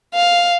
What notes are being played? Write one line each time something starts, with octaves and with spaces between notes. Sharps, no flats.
F5